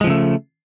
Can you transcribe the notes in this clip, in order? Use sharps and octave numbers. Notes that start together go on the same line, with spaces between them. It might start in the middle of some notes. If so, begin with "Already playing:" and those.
C#3 F3 G#3 A3